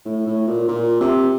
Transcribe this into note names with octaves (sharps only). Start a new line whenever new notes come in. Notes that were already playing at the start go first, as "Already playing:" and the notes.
A2
A2
A#2
A#2
C3